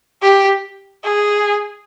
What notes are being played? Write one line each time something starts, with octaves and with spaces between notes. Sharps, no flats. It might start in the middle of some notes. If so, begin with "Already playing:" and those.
G4
G#4